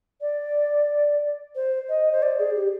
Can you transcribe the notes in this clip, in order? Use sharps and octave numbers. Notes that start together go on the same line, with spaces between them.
D5
C5
D#5
C5
D5
G#4
G4